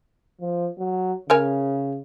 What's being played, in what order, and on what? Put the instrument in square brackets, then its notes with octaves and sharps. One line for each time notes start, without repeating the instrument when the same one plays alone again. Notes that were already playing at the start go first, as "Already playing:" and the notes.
[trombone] F3
F#3
[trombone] C#3 [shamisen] A#4 C#5 G#5